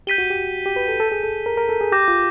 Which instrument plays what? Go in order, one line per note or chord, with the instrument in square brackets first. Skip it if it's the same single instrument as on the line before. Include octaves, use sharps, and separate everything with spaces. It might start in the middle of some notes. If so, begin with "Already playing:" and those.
[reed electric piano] G4 [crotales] G6 B6 D#7 G7
[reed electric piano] F#4
G4
G4
B4
A4
A4
G#4
A4
A#4
A#4
A4
G#4
[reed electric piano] G4 [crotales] D6 G6 A#6
[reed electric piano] F4